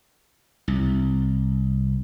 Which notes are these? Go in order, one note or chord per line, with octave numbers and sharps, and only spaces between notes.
C2